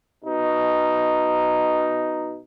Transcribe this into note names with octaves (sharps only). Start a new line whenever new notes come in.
B2 D#4